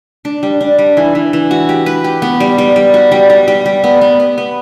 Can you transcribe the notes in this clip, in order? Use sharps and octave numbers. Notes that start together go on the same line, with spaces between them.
D4
G3
D4
G3
E3
E3
E3
F#4
G4
B4
G4
B3
G3
G3
G3
F#4
G3
G3
G3
G3
B3
B3
B3
B3